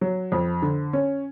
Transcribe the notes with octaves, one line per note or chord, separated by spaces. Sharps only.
F#3
F2
D3
C#4